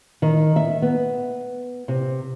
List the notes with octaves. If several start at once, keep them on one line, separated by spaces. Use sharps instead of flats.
D#3
E5
B3
C3